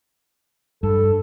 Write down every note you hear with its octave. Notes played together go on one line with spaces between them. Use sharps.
G2 A4